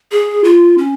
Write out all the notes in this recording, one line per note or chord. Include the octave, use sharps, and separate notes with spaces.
G#4
F4
C#4